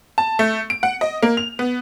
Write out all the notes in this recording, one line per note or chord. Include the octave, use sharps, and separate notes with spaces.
A5
A3
D7
F#5
D#5
A#3
F7
B3